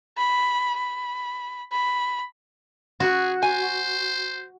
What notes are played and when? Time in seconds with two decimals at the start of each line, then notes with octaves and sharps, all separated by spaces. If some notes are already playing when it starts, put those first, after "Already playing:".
0.18 B5
0.77 B5
1.72 B5
3.00 F#4 G#4
3.43 C5 G#5